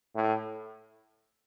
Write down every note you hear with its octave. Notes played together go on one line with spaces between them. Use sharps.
A2